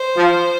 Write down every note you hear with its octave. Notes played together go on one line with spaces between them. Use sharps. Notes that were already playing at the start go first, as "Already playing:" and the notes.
Already playing: C5
F3